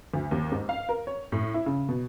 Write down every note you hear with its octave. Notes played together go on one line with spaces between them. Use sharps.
D2
D#2
G#2
F5
A#4
C#5
A2
E4
C#3
B2